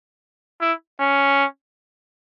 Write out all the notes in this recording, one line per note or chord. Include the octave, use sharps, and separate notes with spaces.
E4
C#4